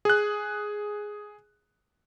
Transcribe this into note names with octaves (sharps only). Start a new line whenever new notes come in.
G#4 F#6